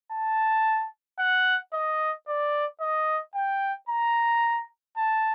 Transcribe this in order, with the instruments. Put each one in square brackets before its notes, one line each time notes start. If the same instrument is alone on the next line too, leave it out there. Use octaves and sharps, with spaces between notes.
[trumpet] A5
F#5
D#5
D5
D#5
G5
A#5
A5